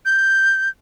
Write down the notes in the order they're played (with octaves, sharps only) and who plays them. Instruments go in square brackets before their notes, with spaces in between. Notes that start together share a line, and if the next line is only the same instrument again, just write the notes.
[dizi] G6